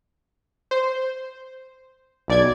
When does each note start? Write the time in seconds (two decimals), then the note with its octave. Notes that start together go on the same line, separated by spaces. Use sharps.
0.71 C5
2.28 B1 D5 G#6